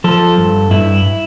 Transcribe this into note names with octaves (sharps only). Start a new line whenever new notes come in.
F3 A4
G2
G2 E4